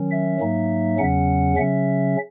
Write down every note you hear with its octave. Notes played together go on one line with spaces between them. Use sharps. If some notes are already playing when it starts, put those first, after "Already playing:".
Already playing: D#3 F#3 C#4
E5
G#2 F#3 A#3 D#4
E2 C#3 F#3 C#4 F#5
C#3 F#3 C#4 E5